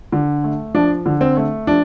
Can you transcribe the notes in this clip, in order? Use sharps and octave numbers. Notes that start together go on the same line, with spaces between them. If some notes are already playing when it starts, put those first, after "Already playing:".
D3
A3
F3 D4
D3
C4
A3
F3 D4